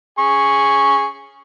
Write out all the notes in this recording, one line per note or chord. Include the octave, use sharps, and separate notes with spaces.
G#4 C#6